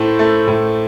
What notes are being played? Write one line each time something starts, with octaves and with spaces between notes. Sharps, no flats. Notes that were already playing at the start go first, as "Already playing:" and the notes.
Already playing: A2 A3 C5
A3
A2